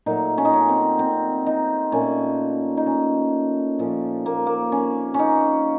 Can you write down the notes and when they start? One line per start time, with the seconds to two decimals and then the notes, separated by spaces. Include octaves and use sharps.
0.06 A#2 F#3 A3 D#4
0.38 C#4
0.45 D#4
0.53 C#4
0.69 C4
0.99 C4
1.47 D#4
1.92 A#2 A3 C#4
2.77 D#4
2.86 C#4
3.79 A#2 F3 A3 C#4
4.26 A#3
4.46 A#3
4.72 C#4
5.14 C#4 D#4